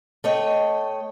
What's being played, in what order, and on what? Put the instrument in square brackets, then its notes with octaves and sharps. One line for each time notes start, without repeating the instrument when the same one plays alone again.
[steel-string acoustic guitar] A3 C#5 D#5 G5